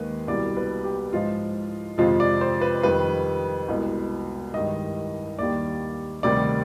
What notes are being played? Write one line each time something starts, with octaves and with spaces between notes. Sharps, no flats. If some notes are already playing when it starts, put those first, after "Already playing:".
Already playing: D#2 D#3 G#3 B4
C2 B2 G3 D5
B4
G4
G#2 F3 G#3 F4
F2 C3 F3 G#3 F4
D5
C5
B4
F2 D#3 G3 B4
C2 B2 G#3
G2 D#3 G#3 D#5
D#2 D#3 G3 D5
D2 C3 D#3 G3 D5